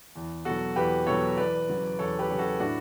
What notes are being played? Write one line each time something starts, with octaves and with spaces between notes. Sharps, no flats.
E2
B2 F#3 F#4 A4
E2 G4 B4
B2 F#3 A4 C#5
E2 B4 D5
C#3 F#3
E2 A4 C#5
G4 B4
C#3 F#3
F#4 A4
A2 D4 F#4